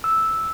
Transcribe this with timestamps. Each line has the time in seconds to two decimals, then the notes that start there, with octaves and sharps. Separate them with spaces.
0.04 E6